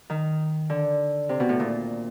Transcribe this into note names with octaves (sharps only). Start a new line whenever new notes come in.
D#3
D3
C3
B2
A2
A#2